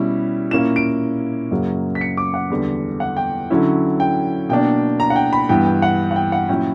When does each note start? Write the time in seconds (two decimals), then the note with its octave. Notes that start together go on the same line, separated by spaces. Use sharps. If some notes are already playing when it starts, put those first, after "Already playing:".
Already playing: B2 G3 C#4 E4
0.51 A#2 A#3 C#4 E4 E7
0.76 D7
1.51 F#2 C#3 F#3 A#3
1.95 B6
2.01 C#7
2.17 D6
2.34 F#5
2.50 E2 D3 G3
3.00 F#5
3.17 G5
3.50 D3 F#3 C#4 E4
4.00 G5
4.49 B2 A#3 D4 G5
5.00 A#5
5.10 F#5
5.16 G5
5.33 B5
5.49 G2 E3 B3 G5
5.66 G5
5.82 F#5
6.11 F#5
6.16 G5
6.32 F#5
6.48 A#2 F#3 C#4 E4 G5